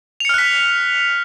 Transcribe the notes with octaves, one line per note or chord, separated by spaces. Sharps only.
F6 F#6 B6 C#7 F7